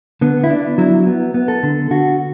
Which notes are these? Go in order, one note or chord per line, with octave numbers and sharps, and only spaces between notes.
D3 B3
E4
B3 D4
F#3 E4
B3
B3
A4
D3
D3 F#4